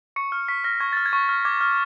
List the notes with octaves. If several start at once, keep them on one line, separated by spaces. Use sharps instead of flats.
C#6 C#7
F6
C#6 B6
F6 A#6
C#6 G#6
F6 A6
G#6
C#6
F6
D6 G#6
F6